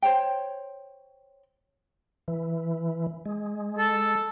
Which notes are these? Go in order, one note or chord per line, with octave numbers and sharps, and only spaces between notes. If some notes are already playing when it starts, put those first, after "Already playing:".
C5 C#5 G5
E3
G#3
A4